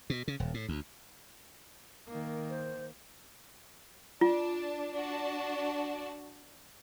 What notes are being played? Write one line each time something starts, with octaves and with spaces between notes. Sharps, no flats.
B2
C#3
D#1
A2
D2
D#3 A#3
C5
D4 F4 A5
D4 F#4 A5